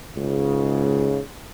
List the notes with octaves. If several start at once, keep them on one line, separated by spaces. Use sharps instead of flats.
C#2 G#2 C#3